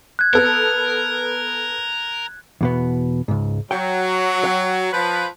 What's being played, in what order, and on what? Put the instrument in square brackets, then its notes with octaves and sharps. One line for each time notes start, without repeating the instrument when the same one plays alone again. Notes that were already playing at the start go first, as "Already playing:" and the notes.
[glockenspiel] F#6 G#6
[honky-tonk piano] B3 A4 [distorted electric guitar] A#4
[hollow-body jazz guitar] E2 B2 B3
C#2 G#2
[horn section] F#3 [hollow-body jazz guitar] G5
[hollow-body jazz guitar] C#5 F#5 G5
[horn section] F3 B4